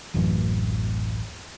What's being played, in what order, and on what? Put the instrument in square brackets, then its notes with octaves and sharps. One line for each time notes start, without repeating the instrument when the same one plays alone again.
[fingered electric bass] D1 A1 F#2 E3